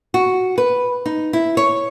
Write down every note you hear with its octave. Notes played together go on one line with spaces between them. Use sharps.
F#4
B4
D#4
E4
C#5